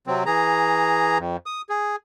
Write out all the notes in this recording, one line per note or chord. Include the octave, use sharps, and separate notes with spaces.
C3 F#3 C4
E3 G#4 A#5
F2
D#6
G#4